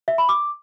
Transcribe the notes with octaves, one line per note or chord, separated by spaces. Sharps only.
E5
B5
D6